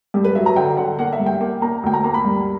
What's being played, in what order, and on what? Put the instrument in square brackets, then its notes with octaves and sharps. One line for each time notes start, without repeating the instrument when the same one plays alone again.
[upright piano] G2 G4
B4
F#3 E5
A#5
D3 G5
D3 F#5
A#3 F#5
E5
G2
G5
A#3 G5
A#3 A#5
D2 G5
A#5
A#3 A#5
B5
G2